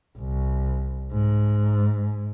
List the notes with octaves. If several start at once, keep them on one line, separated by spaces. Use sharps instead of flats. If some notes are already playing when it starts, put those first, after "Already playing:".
C2
G#2